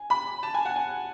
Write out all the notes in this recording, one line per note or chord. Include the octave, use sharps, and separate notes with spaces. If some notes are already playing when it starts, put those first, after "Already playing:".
Already playing: G#5
B5
A5
G#5
F#5
G#5